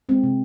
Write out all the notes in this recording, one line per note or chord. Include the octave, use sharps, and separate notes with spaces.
G#3 C4
C3